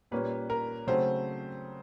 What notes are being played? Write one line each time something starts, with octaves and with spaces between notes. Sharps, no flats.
A#2 G3 A#3 C#4 B4
A#4
C#3 F#3 A3 C4 C5